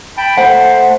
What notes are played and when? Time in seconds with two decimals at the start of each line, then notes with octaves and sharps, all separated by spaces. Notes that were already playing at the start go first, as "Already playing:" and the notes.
0.17 G5 A5 B5
0.38 A3 C5 F#5